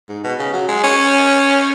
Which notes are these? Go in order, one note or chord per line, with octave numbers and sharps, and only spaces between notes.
G#2
B2
C#3
F#3
G#3
C#4